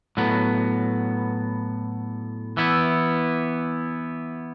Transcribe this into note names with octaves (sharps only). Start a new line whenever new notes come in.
A2 F#3 B3
E3 B3 E4